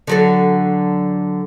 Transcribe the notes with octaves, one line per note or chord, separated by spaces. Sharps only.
D3 F#3 A4